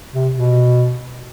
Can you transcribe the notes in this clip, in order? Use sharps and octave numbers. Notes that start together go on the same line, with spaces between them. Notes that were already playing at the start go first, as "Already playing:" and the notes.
C3
B2